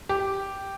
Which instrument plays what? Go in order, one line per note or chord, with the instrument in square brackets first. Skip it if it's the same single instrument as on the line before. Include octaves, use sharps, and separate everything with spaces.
[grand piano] G4